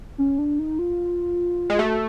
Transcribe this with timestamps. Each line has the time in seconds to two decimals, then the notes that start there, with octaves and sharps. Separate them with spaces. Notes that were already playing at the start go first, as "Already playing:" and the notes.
0.18 C#4
0.38 D4
0.59 D#4
0.79 F4
1.70 G#3 F4
1.79 A3 F#4